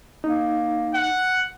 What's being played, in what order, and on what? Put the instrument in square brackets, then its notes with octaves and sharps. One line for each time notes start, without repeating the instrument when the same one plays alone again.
[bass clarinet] A#3 [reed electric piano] D#4
[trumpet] F#5